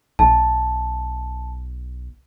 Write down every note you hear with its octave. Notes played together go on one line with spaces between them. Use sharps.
B1 A5